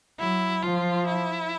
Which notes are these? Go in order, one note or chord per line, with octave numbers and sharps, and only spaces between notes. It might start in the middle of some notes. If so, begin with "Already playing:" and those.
F#3 E4
F3 F4
E4